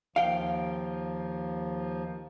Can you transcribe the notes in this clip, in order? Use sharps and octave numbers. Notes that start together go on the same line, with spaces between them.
D#2 F3 F5 G5